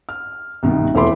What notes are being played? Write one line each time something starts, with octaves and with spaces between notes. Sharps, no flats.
F6
C2 B2 D#3
E1 A3 E4 B5 C6 D6